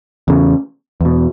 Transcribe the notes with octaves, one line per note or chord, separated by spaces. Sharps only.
E2 C#3
E2 B2